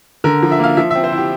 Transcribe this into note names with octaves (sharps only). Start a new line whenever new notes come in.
D3 A#4
F3
E5
A#3 F5
F3 E5
C4 E5
C5
E4
G4